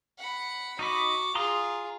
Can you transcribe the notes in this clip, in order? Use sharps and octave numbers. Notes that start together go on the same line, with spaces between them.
F#5 B5
D#4 F#4 D#5 B5 D6
F4 G#4 A#5 C6 D#6